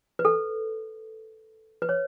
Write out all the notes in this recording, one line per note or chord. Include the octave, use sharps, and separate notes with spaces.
B4
A4
B4
C#5